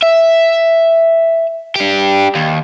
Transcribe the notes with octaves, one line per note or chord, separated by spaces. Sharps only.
E5
D4 G4
D#2